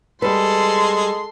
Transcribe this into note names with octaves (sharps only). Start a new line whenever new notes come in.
G3 G#3 A4 B4 C6